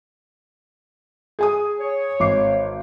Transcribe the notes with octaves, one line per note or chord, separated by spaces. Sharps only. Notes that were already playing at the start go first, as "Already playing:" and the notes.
G#4 G#5 D#6
C#5
G#1 D6 C7